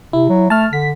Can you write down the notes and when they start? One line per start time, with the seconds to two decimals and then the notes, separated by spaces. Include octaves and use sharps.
0.13 C3 E4
0.29 F#3
0.50 A3 A5 F6
0.73 D3 B6